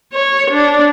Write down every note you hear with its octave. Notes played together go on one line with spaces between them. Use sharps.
C#5
D4